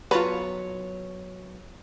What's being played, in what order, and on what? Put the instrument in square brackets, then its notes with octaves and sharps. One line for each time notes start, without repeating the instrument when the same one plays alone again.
[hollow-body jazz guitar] F#3 B3 F#4 [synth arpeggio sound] F4 A5 A#5 [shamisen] B4 [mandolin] C#5